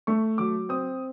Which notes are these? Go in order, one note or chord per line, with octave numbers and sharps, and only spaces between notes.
A3 C#6
F#3 D6
C4 D#6